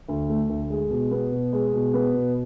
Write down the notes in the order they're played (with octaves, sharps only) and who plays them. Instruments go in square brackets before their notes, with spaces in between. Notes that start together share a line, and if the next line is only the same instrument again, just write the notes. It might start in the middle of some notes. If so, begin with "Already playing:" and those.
[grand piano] D2
A3
D2
G#3
B2
B3
B2
G#3
B2
B3
B2